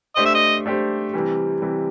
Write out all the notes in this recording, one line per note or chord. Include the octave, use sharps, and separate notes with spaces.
A3 D4 G4 C5 D#5
E5
D#5
A3 D4 G4 C5
C3 E3 G3
C3 E3 G3